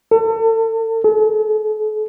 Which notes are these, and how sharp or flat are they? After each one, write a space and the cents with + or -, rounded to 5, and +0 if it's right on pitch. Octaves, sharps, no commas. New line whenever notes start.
A4 +35
A4 -45